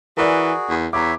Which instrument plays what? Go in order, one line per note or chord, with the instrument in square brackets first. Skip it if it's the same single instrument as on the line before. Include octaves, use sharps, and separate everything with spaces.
[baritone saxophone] E3 [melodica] F#4 G#4 [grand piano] A#4 D5
[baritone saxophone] E2
[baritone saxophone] E2 [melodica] C#5 E5 B5 [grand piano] A#5 D6